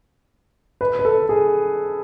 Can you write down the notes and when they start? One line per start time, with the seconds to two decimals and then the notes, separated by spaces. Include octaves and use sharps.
0.81 B4
0.99 B4
1.05 A4
1.29 G#4